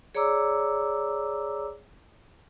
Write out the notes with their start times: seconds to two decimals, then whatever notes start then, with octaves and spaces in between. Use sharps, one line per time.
0.15 G#4 C#5 D5 A#5 D6 E6